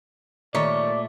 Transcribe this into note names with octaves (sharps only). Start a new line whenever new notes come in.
A#2 D#3 G3 A3 C#5 D5